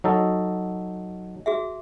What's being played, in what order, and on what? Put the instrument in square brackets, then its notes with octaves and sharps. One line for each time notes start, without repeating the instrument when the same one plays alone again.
[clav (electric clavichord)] F#3 D#4 A4
[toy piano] F#4 G#4 E5